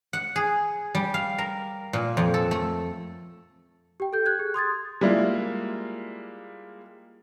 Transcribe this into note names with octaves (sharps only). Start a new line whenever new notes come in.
F#5
G#4
G3
F5
A#4
A#2
F2
A4
A3
G4 G5
A4 G6
F#6 G#6
G#4
C6 D#6 G#6 A6
G3 G#3 A#3 E4 F4